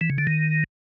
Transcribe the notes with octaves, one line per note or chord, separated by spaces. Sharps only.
E3
C#3
D3
D#3